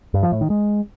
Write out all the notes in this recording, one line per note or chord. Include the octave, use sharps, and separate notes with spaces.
G2
F3
A2
D#3
G#3